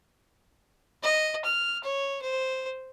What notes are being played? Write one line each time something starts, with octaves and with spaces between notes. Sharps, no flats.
D#5
F6
C#5
C5